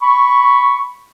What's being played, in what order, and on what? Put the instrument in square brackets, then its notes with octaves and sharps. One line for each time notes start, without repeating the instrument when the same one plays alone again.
[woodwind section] B5 C#6